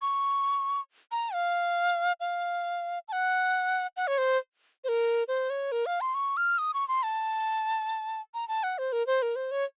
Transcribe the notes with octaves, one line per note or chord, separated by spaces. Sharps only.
C#6
A#5
F5
F5
A5
F#5
F#5
C#5
C5
C5
A#4
C5
C#5
A#4
F5
C6
C#6
F6
D#6
C#6
C6
A5
A#5
A5
F#5
C5
A#4
C5
A#4
C5
C#5